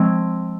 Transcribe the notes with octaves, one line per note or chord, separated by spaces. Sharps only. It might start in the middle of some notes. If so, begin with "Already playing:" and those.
Already playing: F3 G#3 C4